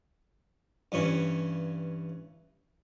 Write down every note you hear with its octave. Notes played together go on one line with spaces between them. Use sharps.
G2 E3 C#4 C#5